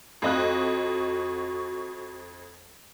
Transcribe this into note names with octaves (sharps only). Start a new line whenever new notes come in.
F2 F#4 D#5 F#6